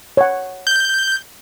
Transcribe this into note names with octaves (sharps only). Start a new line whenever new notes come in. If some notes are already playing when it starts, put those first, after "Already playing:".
C#5 F#5
G6